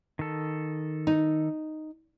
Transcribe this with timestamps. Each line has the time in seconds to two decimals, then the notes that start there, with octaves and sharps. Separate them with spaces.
0.19 D#3 A4
1.07 D#4